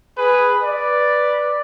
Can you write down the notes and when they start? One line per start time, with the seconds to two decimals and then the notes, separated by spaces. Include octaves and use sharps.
0.18 G#4 B4
0.63 B4 D5